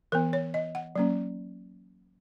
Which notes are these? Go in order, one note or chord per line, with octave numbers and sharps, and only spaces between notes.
E3 B3 A#4
C#5
D#5
F#5
F#3 A#3 C#4